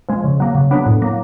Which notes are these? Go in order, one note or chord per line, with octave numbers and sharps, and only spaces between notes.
F3 G#3
C#3
F#3 A#3
C#3
F#3 B3 D4
A2
F#3 A#3